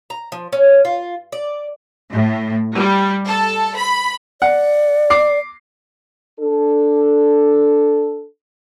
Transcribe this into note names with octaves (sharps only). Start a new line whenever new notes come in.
A#5
F3
C#4
F4
D5
A2
G3
A4
B5
D5 F#5
D6 C7
D4 A4